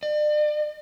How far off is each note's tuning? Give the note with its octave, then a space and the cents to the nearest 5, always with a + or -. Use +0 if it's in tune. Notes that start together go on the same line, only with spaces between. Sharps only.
D5 +40